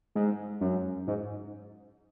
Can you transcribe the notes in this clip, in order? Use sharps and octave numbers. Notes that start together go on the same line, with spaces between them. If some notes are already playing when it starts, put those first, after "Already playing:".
G#2
F#2
G#2